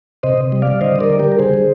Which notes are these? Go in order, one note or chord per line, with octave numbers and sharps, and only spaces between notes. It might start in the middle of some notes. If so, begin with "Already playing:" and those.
C3 C5 D#5
C3
G3
D5 F5
G3
D3 C5 D#5
D3 A#4 D5
G3
G3 G4 A#4
A#4
D3 G#4 C5
D3